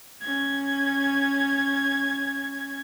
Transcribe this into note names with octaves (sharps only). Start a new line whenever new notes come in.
C#4 G#6